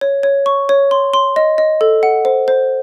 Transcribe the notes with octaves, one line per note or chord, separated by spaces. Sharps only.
C#5
C#5
C#6
C#5
C6
C6
D#5
D#5
A4
F#5
C5
C5